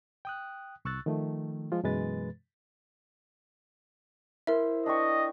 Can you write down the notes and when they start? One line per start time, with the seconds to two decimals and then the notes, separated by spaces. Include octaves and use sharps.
0.25 G5 D#6 F#6
0.85 C2 C#6 E6 F#6 A6
1.06 D#3 F3 A3
1.72 F3 G#3 F4
1.84 F#2 B2 E3 G#3 B4 A6
4.47 E4 A#4 C5 E5
4.86 D4 D#5 G5 C#6